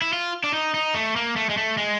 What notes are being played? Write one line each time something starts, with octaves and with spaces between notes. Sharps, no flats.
E4
F4
D4
D#4
D#4
A3
A#3
A3
G#3
A3
G#3